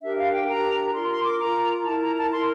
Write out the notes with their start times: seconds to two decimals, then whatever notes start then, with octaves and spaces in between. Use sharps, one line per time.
0.02 D4 G4 A#4 E5
0.18 F5
0.33 G5
0.48 D4 G4 A#4 A#5
0.94 F4 A#4 C6
1.09 C6
1.25 D6
1.40 F4 A#4 A#5
1.85 E4 A#4 A5
2.01 A#5
2.17 A5
2.32 E4 A#4 C6